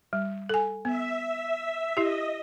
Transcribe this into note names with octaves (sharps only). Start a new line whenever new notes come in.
G3
A4 G#5
B3 E5
E4 G4 D#5